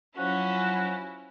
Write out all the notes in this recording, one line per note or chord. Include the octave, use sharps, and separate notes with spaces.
F3 F#3 C#4 E4 F#4